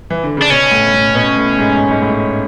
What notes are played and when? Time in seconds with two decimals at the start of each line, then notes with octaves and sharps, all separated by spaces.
0.10 E3
0.23 D3
0.37 C#3
0.42 D4
0.50 B2 C#4
0.71 A2
0.94 A2
1.15 B2
1.36 A2
1.58 G#2
1.90 G#2
2.02 A2